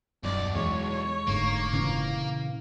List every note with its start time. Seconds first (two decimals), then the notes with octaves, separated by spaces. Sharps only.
0.24 D#1 B1 F#2 D5
0.55 E2 G#3 C#5
1.27 F1 G#2 D3 A#3
1.73 A#2 C#3 E3